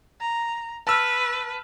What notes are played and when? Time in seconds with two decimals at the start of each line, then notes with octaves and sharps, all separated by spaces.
0.21 A#5
0.87 B4 A5 E6 F6